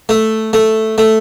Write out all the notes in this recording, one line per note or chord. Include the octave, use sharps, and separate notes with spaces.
A3
A3
A3